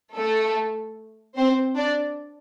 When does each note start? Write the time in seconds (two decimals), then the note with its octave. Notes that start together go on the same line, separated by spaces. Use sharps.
0.16 A3 A4
1.37 C4 C5
1.77 D4 D5